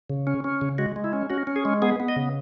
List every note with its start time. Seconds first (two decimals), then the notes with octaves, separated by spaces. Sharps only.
0.10 C#3
0.27 C#4
0.44 C#4
0.61 C#3
0.78 G#3 F#4
0.96 G#3
1.04 E4
1.13 C#4
1.30 C#4 F#4
1.47 C#4
1.56 G#4
1.65 G#3
1.82 B3 G#4
2.00 B3
2.08 D#5
2.16 C#3